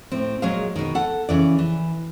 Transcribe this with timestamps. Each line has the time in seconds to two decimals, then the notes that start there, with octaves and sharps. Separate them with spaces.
0.12 A2 C4
0.42 A#2 F#3 G#3 G#4 F5
0.76 B2 D#3
0.95 A4 F#5
1.29 C#3 E3 D5
1.58 E3